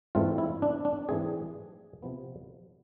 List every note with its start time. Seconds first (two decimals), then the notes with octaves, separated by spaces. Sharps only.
0.15 G#2 E3 A3 C4 F4
0.38 E4
0.62 D4
0.85 D4
1.08 G#2 E3 A3 C4 G#4
2.03 C3 F3 B3